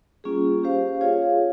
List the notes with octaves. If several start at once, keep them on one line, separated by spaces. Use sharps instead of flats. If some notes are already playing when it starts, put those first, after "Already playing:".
G3 A#3 C#4 F4 G#4
C#4 G4 C5 F5
F4 G#4 C#5 F5